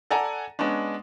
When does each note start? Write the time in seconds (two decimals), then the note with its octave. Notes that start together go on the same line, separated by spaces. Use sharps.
0.10 A4 D5 F#5 G#5 A#5
0.59 G#3 B3 C#4 D4